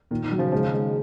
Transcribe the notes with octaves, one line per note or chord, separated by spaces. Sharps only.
A#2 D#3
D#3
F#3
C#3 F3
C#3 F3 G#3
D#3
G#3
D#3